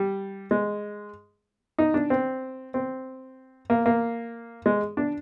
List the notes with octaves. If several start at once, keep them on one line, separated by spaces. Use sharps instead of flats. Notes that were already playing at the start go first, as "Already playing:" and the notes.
Already playing: G3
G#3
D#4
D4
C4
C4
A#3
A#3
G#3
D4